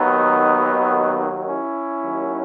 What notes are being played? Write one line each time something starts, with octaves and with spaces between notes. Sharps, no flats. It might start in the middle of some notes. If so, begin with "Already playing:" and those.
Already playing: D#2 D#3 F#3 B3 D#4
C#4 E4
D#2 D#3 F#3